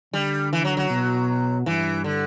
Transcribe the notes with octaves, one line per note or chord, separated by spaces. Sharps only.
D3 G3
E3
F#3
F#3
B2
G2 E3
D3